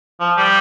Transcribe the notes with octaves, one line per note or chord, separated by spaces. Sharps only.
F3
G3